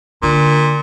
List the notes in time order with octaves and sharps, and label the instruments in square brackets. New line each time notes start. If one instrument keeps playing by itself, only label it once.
[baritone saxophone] A#2 [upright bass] D3